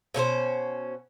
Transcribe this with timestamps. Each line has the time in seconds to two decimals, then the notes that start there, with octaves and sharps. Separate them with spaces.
0.14 B2 C#4 A4 C5